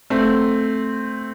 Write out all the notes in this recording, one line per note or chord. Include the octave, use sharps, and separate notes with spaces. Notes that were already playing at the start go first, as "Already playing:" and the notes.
A3 C4